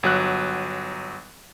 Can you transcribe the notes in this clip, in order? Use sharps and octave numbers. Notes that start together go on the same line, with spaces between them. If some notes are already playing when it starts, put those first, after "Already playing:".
G1 F#3 F#6